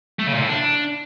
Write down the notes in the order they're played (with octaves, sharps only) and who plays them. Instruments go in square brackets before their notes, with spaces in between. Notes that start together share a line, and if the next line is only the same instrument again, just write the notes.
[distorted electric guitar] A3
C#3
A#2
A2
D4